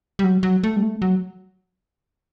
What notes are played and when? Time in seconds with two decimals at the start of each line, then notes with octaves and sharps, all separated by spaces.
0.19 G3
0.24 F#3
0.43 F#3
0.63 A3
0.77 G3
0.83 A3
1.02 F#3